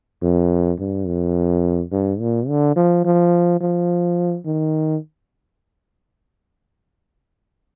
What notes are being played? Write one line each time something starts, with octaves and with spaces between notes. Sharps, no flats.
F2
G2
F2
G2
A#2
D3
F3
F3
F3
D#3